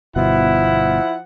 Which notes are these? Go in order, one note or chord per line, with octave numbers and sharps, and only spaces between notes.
G1 B2 F3 E4 F#5